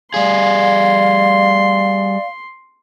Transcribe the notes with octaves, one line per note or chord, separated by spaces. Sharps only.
G3 G#4 D5 F5 C6